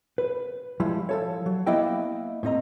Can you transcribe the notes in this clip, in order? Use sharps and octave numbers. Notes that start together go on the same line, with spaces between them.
B4
F3 G3 G#3 E4
F3 A4 C#5
F#3
A#3 B3 E4 D#5 E5 G5
A2 C4 D#5 A#5